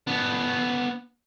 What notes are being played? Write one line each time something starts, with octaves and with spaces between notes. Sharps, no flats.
B3 D4